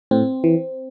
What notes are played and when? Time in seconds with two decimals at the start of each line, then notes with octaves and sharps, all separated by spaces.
0.11 A2 C4
0.44 E3